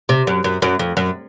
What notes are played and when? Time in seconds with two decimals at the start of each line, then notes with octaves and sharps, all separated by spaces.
0.09 C3
0.27 F#2
0.44 F#2
0.62 F#2
0.79 F2
0.97 F#2